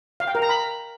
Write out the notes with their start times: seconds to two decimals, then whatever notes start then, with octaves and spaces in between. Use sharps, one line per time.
0.20 F5
0.27 G5
0.35 A#4
0.42 A#5
0.49 B5